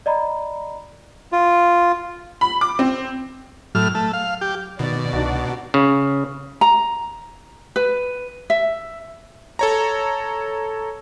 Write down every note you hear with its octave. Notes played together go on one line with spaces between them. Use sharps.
D5 D#5 A#5 B5
F4
B5
D6
C4
A2 F#3 F6
A3
F5
G4
B2 D#3 D5
C2 D4 D#4 F#4
C#3
A#5
B4
E5
A4 C#5 A#5